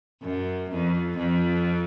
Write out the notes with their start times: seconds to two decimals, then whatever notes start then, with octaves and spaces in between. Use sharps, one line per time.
0.23 F#2
0.71 F2
1.17 F2